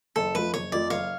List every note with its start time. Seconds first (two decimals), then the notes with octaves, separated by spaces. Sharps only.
0.16 F#1 A4
0.34 F2 F3 A3 B4
0.54 F#1 C#5
0.72 F2 F3 A3 D5
0.90 F#1 C#5 F5